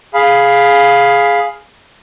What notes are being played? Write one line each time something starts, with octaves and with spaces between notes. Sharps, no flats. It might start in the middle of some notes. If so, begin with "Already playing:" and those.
G#4 F5 B5